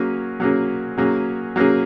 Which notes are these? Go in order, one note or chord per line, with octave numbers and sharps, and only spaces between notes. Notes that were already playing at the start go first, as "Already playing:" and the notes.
Already playing: F#3 A#3 C#4 G#4
F#3 A#3 C#4 G#4
F#3 A#3 C#4 G#4
F#3 A#3 C#4 G#4